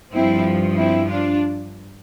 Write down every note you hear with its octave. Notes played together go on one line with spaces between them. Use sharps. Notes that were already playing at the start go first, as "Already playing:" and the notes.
G2 F3 C4 E4
C4 E4
D4 F4